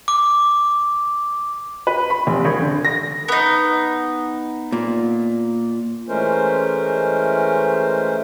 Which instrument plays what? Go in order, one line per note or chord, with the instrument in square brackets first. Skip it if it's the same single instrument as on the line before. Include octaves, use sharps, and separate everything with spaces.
[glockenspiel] D6
[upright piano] B4
B5
F1
G#1
D3
A#6
[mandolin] B3 D#4
[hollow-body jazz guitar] A#2
[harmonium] E3 G#3 A3 C#4 A#4 C5